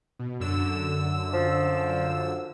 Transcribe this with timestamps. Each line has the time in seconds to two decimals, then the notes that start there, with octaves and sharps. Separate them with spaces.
0.19 B2
0.40 F#2 D3 E6
1.34 F3